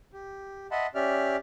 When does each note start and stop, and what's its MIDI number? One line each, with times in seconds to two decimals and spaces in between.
0.13 0.67 67
0.71 0.87 75
0.71 0.87 76
0.71 0.87 78
0.71 0.87 81
0.71 0.87 83
0.71 0.87 84
0.95 1.37 61
0.95 1.37 67
0.95 1.37 74
0.95 1.37 76
0.95 1.37 89